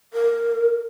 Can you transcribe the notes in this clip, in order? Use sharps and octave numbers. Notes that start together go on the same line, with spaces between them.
A#4